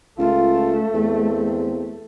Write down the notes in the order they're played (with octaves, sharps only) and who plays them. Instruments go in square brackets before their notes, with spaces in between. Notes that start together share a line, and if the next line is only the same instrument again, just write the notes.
[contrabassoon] C#2 [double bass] A3 [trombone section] F4
[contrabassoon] E2 [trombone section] G#3 A#3 C4